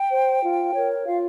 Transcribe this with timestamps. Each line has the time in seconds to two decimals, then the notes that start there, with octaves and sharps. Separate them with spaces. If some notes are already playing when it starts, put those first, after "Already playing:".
Already playing: G5
0.11 C5
0.43 F4
0.74 A#4 C#5
1.06 F4 F5